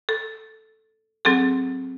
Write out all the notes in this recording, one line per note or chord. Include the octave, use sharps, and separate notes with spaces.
A4
F#3 C4 G#4 A4